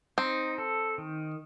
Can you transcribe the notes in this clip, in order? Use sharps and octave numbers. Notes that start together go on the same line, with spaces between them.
C4 D#4
A4
D#3